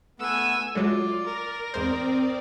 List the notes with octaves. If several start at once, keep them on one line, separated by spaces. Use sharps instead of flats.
A3 B3 F#5 G#5 E6
F#3 G#3 A3 F4 D5
A#4
E2 G#2 C4 C5 D5 D#6